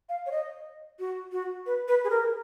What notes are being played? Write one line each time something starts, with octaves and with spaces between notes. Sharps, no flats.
F5
C#5
D#5
F#4
F#4
B4
B4
G#4
A#4